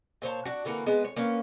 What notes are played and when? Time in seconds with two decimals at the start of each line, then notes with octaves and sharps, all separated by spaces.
0.22 A#2 C5 C#5 A5
0.45 D4 F#4
0.65 D3 E3 A#3 F#4
0.86 G#3 B3 D#5
1.04 C#5
1.16 A#3 B3 C#4